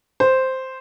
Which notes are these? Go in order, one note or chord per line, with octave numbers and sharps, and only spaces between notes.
C5